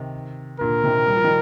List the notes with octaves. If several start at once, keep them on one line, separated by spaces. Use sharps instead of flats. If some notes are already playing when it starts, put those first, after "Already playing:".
Already playing: C3 D#3
A#2 D3 A#4
C3 D#3
G3
F3
D#3 G3